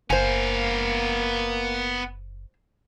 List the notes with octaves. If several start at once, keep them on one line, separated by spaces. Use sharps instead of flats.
F#1 A#3 B3 C5 F5 G#5